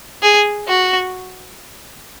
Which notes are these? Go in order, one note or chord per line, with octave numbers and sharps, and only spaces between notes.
G#4
F#4